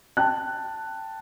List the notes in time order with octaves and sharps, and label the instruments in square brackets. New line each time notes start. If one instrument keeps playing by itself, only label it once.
[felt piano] G5 A5 F#6